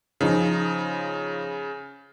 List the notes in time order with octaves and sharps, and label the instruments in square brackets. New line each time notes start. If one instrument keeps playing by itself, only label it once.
[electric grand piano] C#3 [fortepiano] F3 D#4 F4